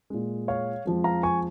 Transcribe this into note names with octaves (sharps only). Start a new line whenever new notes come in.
A#2 G#3
C#5 F5
F2 F3 G#3
F5 A#5
G#5 C#6